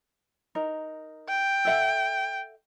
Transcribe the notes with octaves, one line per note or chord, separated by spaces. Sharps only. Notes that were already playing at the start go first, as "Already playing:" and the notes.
D#4 A#4
G5
A4 E5 F#5